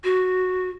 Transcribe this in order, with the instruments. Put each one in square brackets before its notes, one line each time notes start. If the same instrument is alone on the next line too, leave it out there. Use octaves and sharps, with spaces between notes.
[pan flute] F#4